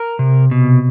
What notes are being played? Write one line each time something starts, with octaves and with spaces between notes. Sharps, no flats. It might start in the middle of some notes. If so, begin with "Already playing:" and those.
Already playing: A#4
C3
B2